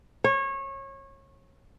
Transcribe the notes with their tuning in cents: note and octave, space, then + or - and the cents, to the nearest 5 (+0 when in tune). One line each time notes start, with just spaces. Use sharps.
C#5 -25